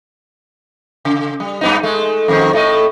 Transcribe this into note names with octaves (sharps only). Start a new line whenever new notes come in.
C#3
G3
G2 B3 D#4
G#3 A3
F2 G#2 D#3
A2 A3 D#5